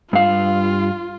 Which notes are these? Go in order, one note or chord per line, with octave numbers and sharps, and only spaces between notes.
G2 F4 F5